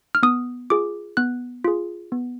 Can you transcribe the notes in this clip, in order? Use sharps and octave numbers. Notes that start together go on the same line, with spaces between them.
F6
B3 D#6
F4 G#4 D6
B3 F#6
F4 G#4
B3